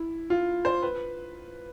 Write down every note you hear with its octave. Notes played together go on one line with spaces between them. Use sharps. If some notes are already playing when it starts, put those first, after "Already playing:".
Already playing: E4
F4
C5
B4